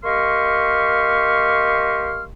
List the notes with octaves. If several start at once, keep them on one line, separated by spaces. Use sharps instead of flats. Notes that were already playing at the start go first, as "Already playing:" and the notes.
A#3 G4 D#5 C6 C#6 F6